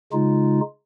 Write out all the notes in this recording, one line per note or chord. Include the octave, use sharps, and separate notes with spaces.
C#3 G#3 D#4 F4